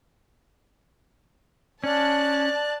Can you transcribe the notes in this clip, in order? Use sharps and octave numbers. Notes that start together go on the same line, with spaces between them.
C#4 D5 A5 F#6